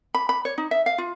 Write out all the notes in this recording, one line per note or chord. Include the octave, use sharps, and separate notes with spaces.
B5
B5
C#5
D#4
E5
F5
F4